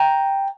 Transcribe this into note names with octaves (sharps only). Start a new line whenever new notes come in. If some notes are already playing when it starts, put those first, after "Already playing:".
Already playing: G5 A#5